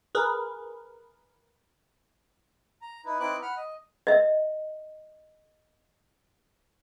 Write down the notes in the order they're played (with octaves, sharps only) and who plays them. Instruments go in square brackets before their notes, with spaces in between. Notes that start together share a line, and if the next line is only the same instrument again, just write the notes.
[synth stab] G#4 A#4 B4
[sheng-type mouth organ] A#5
D#4 E4 B4
C4 D#4 E4 B4 D6 F#6
F#5 B5 F6
D#5
[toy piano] D#5 E5